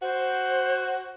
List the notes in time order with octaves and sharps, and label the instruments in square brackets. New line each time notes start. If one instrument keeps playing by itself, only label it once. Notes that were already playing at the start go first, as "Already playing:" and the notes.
[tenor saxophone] F#4 [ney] C5